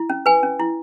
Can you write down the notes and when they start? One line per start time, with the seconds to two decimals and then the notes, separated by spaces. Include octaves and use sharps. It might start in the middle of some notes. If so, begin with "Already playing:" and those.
Already playing: E4
0.10 C#4
0.26 B4 G#5
0.43 C#4
0.60 E4